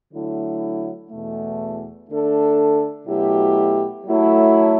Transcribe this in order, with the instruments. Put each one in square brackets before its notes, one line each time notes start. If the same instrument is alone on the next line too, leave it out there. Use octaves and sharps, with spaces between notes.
[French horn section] D3 F#3 A3 E4
E2 B2 A3
D3 A3 D4 A4
B2 F#3 A3 E4 G4
F#3 A3 E4